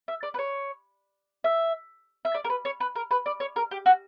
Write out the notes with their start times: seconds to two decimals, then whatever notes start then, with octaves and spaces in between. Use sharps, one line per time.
0.08 E5
0.23 D5
0.34 B4
0.39 C#5
1.44 E5
2.25 E5
2.34 D5
2.44 A#4
2.50 B4
2.65 C#5
2.80 B4
2.95 A#4
3.11 B4
3.26 D5
3.40 C#5
3.56 A#4
3.71 G4
3.86 F#4